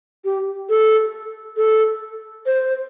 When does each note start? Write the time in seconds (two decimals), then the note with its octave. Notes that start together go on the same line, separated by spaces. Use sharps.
0.25 G4
0.70 A4
1.57 A4
2.46 C5